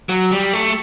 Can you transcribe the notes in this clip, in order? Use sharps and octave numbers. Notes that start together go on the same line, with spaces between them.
F#3
G3
A3